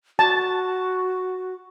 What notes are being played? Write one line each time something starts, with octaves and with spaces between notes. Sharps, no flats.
F#4 A5